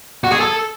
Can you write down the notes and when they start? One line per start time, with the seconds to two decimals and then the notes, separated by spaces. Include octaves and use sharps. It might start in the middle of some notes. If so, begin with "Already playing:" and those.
0.24 F#4
0.32 G#4
0.40 A4